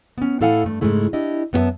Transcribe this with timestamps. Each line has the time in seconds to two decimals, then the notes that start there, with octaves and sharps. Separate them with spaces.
0.18 B3 C#4
0.41 A2 E4 A4 F5 F#5 G#5
0.64 G2 A3
0.81 G#2 C#3 G#3 A3 E4
1.13 D4 E4 G4 D#5
1.53 F#2 B3 D4 G4 E5 A5